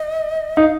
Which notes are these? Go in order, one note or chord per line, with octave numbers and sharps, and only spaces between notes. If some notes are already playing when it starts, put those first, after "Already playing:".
Already playing: D#5
D#4 F5